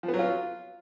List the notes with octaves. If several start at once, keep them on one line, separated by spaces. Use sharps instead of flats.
F3
B3
F#3
F4